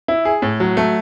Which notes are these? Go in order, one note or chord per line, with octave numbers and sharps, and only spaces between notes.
E4
G#4
A2
F#3
A3